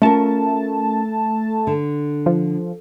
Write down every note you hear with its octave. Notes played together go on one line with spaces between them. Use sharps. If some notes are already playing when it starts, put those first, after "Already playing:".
A3 C#4 F4 A#4 A5
D3
F3